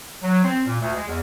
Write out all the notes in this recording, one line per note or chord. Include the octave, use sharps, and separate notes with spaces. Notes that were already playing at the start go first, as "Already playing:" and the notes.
F#3
C4
A#2
D2
G#3
E2